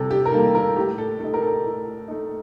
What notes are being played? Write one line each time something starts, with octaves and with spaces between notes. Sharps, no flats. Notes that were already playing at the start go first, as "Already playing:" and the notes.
Already playing: C3 G3 A4
G4
A#4
D#3 G3 A#3 A4
A#4
A2 G4
A4
A3 D#4 A4
A#4
A4
A2
A3 D#4